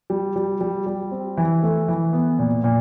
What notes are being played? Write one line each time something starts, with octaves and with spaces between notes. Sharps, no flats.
G3
G3
G3
G3
C4
E3
A3
E3
B3
A#2
A#2